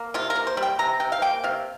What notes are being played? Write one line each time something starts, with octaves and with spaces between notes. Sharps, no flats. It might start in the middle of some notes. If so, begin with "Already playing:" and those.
Already playing: A#3
C3 F4
A#4
A#3
C5
G3
G5
C3 A#5
C3 G5
F5
A#3 G5
C3 F5